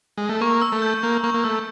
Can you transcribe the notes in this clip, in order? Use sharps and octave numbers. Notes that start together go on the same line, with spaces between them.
G#3
A3
A#3 C#6
E6
A3
G6
A#3 C#6
A#3 C#6
A#3
A3 E6